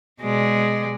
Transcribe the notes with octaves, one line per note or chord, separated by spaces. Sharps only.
B2 G#3 D5